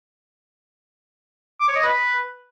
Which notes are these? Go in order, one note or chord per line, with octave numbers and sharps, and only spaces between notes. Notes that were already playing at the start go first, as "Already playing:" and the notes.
D6
C#5
D#5
B4